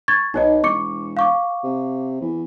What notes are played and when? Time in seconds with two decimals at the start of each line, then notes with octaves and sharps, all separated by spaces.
0.08 C#6 G#6 A6
0.34 B1 D#4 C#5 D#5
0.64 E1 C#6 D6 C#7
1.17 F5 C#6 D6
1.64 C3
2.21 E2